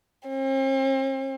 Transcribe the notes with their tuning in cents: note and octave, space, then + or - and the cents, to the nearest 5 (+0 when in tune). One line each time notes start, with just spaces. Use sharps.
C4 +45